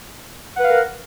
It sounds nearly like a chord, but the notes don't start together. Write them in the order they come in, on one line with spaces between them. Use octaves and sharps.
F#5 B4 F5 A#4